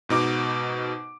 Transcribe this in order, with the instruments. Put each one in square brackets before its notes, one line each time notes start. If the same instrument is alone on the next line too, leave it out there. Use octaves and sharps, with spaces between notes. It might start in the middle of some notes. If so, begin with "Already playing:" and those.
[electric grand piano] G#2 B2 D#4 D6